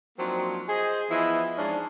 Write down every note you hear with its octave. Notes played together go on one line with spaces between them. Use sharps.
F3 F#3 A#3 C4 D4 D#4
G#4 C5 D#5
E3 F3 B3 E4 D#5
G#2 F3 C#4 D4 G#4 A5